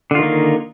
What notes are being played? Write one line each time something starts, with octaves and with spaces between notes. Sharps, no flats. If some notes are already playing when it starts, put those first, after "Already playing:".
D3 D#3 A#3 F4